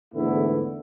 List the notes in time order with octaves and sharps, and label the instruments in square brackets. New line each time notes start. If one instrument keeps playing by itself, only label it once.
[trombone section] E2 G#2 D3 A3 B3 E4